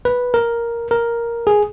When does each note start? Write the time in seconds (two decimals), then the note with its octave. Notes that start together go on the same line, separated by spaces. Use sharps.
0.05 B4
0.34 A#4
0.91 A#4
1.47 G#4